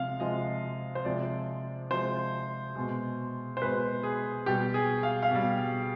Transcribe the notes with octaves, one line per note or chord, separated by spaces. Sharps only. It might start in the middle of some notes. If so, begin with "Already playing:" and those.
Already playing: C3 F3 G#3 F5
C3 F3 G#3 D#5
C5
C3 F3 G#3 D5
C3 F3 G#3 C5
B2 G#3
C5
B2 G#3 B4
G#4
B2 G3 G4
G#4
F5
F5
B2 G3